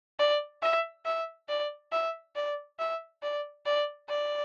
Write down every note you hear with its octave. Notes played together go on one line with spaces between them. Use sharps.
D5
E5
E5
D5
E5
D5
E5
D5
D5
D5